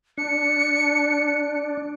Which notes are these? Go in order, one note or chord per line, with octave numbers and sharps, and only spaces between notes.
D4 C#7